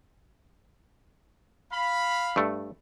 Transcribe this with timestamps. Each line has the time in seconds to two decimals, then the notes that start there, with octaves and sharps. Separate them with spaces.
1.73 F5 B5
2.36 G2 A3